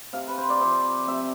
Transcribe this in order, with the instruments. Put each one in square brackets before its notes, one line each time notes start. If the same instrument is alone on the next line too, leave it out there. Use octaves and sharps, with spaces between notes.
[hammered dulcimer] C3 F5
B4
C5
D5
F3 C4 E5
C3 E5